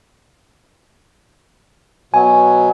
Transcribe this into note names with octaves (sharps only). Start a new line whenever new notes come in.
B2 F#3 G#5